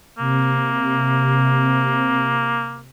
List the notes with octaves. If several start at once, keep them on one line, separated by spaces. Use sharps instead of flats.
C3 A#3